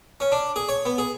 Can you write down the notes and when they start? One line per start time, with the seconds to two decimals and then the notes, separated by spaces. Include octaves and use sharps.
0.20 C#4
0.32 D4
0.56 G#4
0.69 C#5
0.85 B3
0.98 G#4